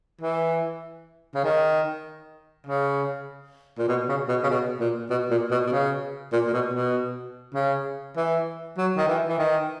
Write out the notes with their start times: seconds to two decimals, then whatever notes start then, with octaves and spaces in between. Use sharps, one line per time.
0.21 E3
1.35 C#3
1.44 D#3
2.66 C#3
3.78 A#2
3.88 B2
4.09 C#3
4.29 B2
4.43 C#3
4.50 B2
4.80 A#2
5.10 B2
5.30 A#2
5.51 B2
5.67 B2
5.72 C#3
6.32 A#2
6.47 A#2
6.53 B2
6.73 B2
7.54 C#3
8.17 E3
8.78 F#3
8.97 D#3
9.07 E3
9.28 E3
9.38 D#3